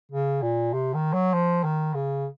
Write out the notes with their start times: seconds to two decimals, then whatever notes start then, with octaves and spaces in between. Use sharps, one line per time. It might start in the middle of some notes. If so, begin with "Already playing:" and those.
0.12 C#3
0.42 A#2
0.73 C3
0.94 D#3
1.13 F#3
1.33 F3
1.64 D#3
1.94 C#3